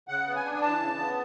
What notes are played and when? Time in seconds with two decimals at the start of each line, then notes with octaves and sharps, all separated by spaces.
0.08 C#3 F#5
0.27 B3
0.36 G#5
0.45 D4
0.62 E3 A5
0.81 C#3
0.99 B3